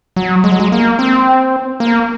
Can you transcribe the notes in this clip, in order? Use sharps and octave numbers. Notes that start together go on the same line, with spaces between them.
F#3
G#3
F#3
G#3
A#3
C4
A#3